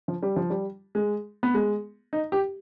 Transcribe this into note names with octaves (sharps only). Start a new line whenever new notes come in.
F3
G3
F3
G3
G#3
B3
G#3
D#4
G4